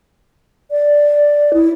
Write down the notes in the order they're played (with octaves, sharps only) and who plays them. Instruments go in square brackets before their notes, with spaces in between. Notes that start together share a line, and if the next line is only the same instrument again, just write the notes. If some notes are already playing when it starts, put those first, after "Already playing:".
[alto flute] D5
E4